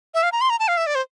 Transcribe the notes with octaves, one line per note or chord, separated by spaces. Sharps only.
E5
F5
A#5
C6
A#5
A5
F5
E5
D5
C5